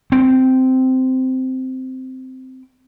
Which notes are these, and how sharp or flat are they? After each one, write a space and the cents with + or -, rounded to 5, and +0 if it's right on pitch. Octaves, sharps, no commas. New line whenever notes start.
C4 -10